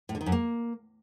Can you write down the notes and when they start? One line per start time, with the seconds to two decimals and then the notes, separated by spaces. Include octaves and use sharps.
0.09 A2
0.15 D3
0.21 D#3
0.26 F#2
0.32 A#3